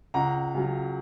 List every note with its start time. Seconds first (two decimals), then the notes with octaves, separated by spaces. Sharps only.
0.14 C#2 F#5 A#5
0.54 C#3 F#3